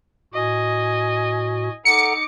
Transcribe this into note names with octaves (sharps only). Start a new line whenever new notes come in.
A2 F#4 D#5 G#5
D#4 A4 F#5 A#5 D6 C#7